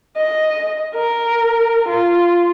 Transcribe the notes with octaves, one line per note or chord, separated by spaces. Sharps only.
D#5
A#4
F4